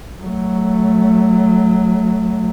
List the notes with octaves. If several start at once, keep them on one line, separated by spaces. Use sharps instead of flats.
F#3 A3